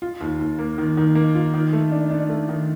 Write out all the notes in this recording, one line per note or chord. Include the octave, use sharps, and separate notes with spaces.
F4
D#2
D#2
A#3
D#3
D#3
A#3
F4
D#3
A3
D4
D4
A3
D#3